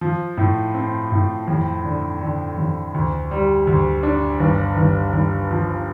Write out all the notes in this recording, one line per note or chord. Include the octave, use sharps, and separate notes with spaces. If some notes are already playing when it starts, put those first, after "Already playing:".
F3
A2
C4
A2
F2
D3
D3
F2
D2
G3
D2
D4
G1
G1
G1
F3